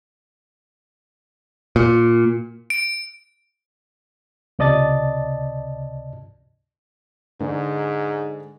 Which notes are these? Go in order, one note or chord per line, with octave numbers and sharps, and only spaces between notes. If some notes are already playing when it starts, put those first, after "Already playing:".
A#2
D7
C#2 C3 D5 D#5 A5 A6
G#2 D3 G#3 D4